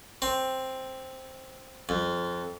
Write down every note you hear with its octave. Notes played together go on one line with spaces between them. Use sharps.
C4
F2